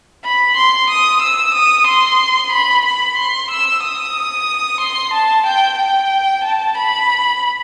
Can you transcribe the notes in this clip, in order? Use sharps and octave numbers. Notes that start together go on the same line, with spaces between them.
B5
C6
D#6
E6
D#6
C6
B5
B5
C6
E6
D#6
C6
A5
G5
G5
A5
B5